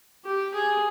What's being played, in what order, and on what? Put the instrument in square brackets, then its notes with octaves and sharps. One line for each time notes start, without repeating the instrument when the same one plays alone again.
[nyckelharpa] G4
G#4